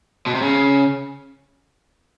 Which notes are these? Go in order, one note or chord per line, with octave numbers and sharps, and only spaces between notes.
B2
C3
C#3